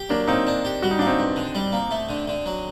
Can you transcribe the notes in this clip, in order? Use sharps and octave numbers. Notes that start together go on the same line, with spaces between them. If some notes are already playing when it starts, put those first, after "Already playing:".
Already playing: G4
F#3 A#3 D4
A#3 C4 D#4
D4
G4
G3 F#4
D#4
A#3 D4
C4 D#4
G2
D3
G3
A#3
A3
D3
D3
F#3